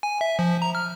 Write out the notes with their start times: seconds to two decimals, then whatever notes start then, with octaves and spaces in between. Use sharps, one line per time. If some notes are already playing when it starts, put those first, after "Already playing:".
0.03 G#5
0.21 E5
0.39 F3
0.62 A#5
0.75 F6